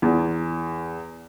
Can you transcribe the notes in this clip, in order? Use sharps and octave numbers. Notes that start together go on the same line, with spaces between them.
E2